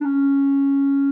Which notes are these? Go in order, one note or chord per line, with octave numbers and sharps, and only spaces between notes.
D4
C#4